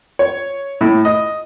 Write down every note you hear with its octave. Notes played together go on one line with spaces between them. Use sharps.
C#5
A2
D#5